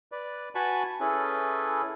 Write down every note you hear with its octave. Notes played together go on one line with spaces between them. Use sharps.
B4 D5
F#4 B4 G#5 A5 B5 C#6
C#4 E4 G#4 A4 B4